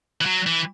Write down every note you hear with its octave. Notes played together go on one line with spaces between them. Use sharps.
E3
F#3
E3